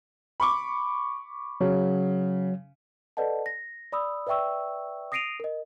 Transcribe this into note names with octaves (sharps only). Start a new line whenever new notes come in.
B5 C#6 D6
C#3 F#3
A4 B4 D5 D#5 F#5 A5
A#6
D5 B5 D#6 E6
B4 D5 E5 G5 C#6 E6
D#6 A#6 C7 D7 D#7 F7
A#4 D#5